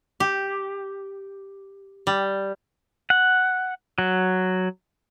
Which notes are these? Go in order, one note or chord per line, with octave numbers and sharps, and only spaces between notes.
G4
G3
F#5
F#3